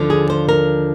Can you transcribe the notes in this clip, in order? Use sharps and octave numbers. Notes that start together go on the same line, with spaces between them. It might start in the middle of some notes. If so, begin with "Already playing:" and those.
Already playing: D#2 D3 F3
G#4
C5
A#4